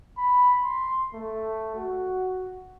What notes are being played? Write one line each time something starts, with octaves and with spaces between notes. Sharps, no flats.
B5
C6
A3
F#4